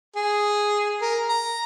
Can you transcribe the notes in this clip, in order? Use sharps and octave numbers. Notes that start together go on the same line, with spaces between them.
G#4
A#4
A#5